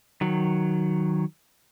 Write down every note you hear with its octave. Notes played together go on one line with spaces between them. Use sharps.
D#3 F#3